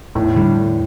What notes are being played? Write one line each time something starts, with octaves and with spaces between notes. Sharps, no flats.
E2 A2
D3 G3 D4
E2